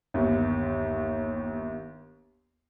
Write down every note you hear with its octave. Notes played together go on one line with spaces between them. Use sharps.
G1 D#2